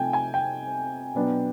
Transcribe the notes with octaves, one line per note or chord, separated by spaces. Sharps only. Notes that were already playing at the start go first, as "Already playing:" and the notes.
Already playing: C3 F3 A3 C4 D#4 G5 G#5
G#5
G5
B2 F#3 B3 D4